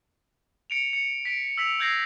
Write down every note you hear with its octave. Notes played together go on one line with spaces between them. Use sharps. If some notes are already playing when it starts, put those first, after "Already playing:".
C#7 D7 F7
C#7
B6 D7
E6 B6 F7
E6 G6 G#6 A#6 C7